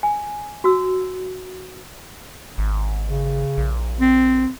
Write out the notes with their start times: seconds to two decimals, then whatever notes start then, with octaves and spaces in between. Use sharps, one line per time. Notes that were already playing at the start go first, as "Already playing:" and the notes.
0.03 G#5
0.64 F#4 E6
2.58 G#1
3.08 C#3
3.57 A#1
4.01 C4